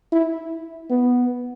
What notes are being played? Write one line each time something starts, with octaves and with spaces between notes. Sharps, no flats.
E4
B3